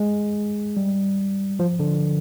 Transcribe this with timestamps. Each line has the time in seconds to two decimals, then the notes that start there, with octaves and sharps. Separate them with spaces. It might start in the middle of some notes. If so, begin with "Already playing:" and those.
Already playing: G#3
0.77 G3
1.59 F3
1.80 D3